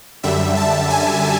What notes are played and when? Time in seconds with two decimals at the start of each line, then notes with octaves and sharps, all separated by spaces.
0.23 F#2 D3 G3 E5
0.57 A5
0.90 G#5